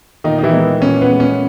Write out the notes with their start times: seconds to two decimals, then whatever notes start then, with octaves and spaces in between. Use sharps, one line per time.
0.24 A#2 D#3 D#4
0.39 D#4
0.43 E3 E4
0.53 G#3
0.81 A#2 C#4
1.01 B3
1.11 G#3
1.20 C#4